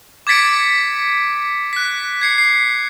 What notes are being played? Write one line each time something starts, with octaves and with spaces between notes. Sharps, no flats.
D6 G#6 A6 B6 C#7 D7
F#6 B6
G#6 C7 C#7
C7